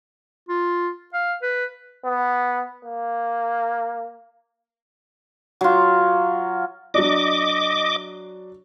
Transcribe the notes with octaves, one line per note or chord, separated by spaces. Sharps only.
F4
F5
B4
B3
A#3
F#3 F4
F#3 D4 D#5 D6